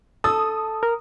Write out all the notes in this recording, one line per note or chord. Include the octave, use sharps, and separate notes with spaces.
A4 D#6
A#4